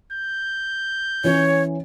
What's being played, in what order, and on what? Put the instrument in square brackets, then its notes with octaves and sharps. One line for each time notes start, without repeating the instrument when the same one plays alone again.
[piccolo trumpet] G6
[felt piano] E3 C#4 [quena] C#5